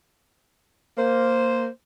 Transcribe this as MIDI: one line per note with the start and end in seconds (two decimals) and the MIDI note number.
0.98 1.67 58
0.98 1.67 72